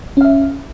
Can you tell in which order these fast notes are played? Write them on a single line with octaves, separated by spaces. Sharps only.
C#4 F5 E5